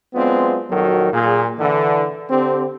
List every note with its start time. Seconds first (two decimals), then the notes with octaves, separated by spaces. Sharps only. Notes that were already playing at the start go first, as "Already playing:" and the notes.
0.14 F#3 G#3 B3 C4 D4 F4
0.70 A#1 D#3 F#3 F#4 A4 A#4
1.12 A#2 G#4
1.59 D3 E3 A4
2.31 D3 C4 G4